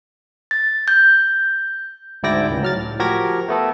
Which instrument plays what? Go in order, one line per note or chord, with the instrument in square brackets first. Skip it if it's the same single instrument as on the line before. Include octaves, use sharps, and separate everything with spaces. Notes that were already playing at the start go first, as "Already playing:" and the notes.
[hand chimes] A6
G6
[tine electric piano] D2 G#2 E4 D5 G5 A#6
C#2
F#3 F6 A6
A2
F3 F#4 G4 A#4 G#6 A#6
A3 B3 A4